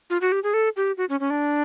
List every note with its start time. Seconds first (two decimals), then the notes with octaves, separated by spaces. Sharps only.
0.10 F4
0.21 F#4
0.32 G4
0.44 G#4
0.54 A4
0.77 G4
0.97 F#4
1.09 C#4
1.20 C#4
1.30 D4